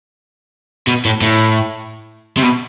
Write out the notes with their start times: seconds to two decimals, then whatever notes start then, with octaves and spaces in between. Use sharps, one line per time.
0.87 B2
1.05 A2
1.21 A2
2.37 C3
2.43 B2